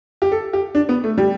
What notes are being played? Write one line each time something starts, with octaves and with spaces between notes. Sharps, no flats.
G4
A4
G4
D4
B3
A3
G3